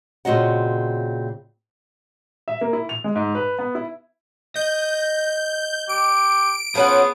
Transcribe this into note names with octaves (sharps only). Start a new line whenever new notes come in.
A#2 C#3 C4 F#4 D#5 F#5
E5
A#3
E4
F7
G#3
G#2
B4
B3
E4
D#5 G6
G4 D7
F3 B3 C#4 G#4 F#5